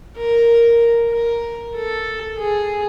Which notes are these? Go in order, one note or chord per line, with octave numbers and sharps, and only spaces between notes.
A#4
A#4
A4
G#4